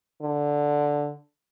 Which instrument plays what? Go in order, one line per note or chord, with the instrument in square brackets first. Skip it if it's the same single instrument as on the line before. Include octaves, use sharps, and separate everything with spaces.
[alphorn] D3